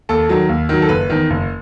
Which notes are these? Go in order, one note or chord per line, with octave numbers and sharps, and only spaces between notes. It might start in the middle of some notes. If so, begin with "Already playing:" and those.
D#2 A4
D#3 F#3
D#2
D#3 F#3
A4
F#1 B4
E2 D#3
F#1